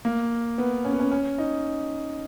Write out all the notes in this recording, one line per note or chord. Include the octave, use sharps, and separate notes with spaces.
A#3
B3
C#4
B3
C#4
C#4
D#4